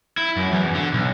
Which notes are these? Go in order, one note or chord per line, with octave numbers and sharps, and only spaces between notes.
E4
F#2
E2
D3
B1